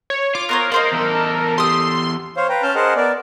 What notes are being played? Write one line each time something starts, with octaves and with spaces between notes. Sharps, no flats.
C#5
F4 D6
B3 A#4 C5 C#5
A#3 D#4 C5 D5
E2 A4
G4 C6 D#6
C5 C#5 F5
B4 G5 A#5
C#4 A5 F6 G6
G#4 A#4 C5 D#5 F#5 A5
B3 A#4 D5